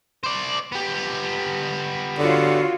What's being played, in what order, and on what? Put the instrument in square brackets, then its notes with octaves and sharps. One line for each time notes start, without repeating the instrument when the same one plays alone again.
[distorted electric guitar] C5 D5
B3 G4
[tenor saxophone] D3 [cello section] F4 F#4 C#5